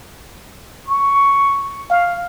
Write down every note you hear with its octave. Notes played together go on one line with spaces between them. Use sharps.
C#6
F5